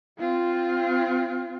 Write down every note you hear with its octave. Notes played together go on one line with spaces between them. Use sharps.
C4 F4